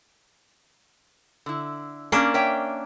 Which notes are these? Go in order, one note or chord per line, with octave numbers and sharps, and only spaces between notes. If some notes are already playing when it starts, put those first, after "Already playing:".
D3 E4
A#3 C#4 D4
C#5 E5 G5